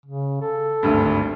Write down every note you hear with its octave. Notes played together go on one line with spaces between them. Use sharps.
C#3
A4
G#1 D2 G2